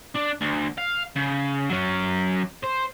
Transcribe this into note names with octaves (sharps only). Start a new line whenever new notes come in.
D4
D2
F5
C#3
F#3 C#4
C5